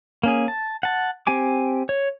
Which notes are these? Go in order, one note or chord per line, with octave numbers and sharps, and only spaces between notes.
A#3 C#4 G#4
A5
F#5 A5
C4 G4 G#5 D6
C#5